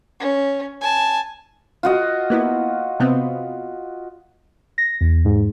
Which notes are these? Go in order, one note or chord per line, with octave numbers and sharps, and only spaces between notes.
C#4
G#5 A5
F4 F#4 D#5
A#3 B3 E4
C3 B3 C4
A#6
E2
G#2